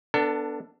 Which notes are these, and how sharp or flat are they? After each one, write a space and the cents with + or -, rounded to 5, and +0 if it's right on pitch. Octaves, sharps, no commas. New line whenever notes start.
B3 +0 D4 +0 A4 +25